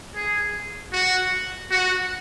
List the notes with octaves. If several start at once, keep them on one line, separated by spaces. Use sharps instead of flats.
G#4
F#4
F#4